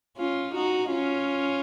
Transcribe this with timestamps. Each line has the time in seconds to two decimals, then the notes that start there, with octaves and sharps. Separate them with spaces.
0.17 C#4 F4
0.54 D#4 F#4
0.91 C#4 F4